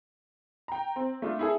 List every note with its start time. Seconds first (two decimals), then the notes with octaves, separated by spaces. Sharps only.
0.68 G5 A#5
0.96 C4
1.22 A3 D4 F4
1.39 E4 G#4 A4